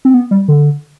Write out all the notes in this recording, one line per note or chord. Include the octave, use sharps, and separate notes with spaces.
C4
B3
G3
D3